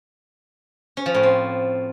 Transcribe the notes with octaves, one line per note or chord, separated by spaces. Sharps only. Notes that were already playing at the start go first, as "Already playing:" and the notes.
C#4
F3
A2
C4